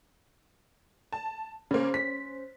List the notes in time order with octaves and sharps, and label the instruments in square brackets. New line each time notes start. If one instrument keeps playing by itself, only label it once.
[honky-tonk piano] A5
[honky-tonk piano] C#3 A#3 [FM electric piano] C#4 C5
[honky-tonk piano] B6